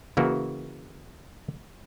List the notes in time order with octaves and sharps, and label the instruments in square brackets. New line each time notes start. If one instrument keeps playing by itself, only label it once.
[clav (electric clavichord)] C#3 E3 A#3 F#4